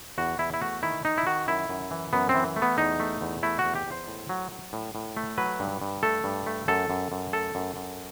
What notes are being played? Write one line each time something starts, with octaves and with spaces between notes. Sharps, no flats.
E2 F#4
E2 E4
E4
A3 F#4
D#3 E4
D#3 D#4
E4
D#3 F#4
F#2 E4
F#2
E3
F#2 B3
C4
E3
A3
B3
E2 D#4
A3
E2
A3 E4
F#4
E2
G4
E2
C5
A2
F#3
F#3
A2
A2
A3
F#3 B4
G2
G2
A3 A4
G2
A3
F#2 A4
F#2
F#2
A3 A4
F#2
F#2